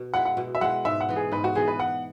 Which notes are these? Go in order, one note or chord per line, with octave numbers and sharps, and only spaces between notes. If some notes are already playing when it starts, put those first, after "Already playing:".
Already playing: B2
G#3 E4 F#5
F#5
B2
E5
G#3 E4 F#5
G#2 E5
F#5
E3 B3
G#4
G#2 B4
F#4
E3 B3 G#4
B4
E3 F#5